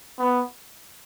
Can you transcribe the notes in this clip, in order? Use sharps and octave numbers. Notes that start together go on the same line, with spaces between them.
B3